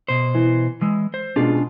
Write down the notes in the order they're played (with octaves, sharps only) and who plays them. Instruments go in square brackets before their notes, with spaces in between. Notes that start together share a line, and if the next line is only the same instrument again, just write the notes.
[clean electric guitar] B2 C5
[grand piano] E3
[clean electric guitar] E3 G#3 [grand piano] E6
[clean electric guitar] C5
[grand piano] B2 G#3 [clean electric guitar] C#4 D4 F4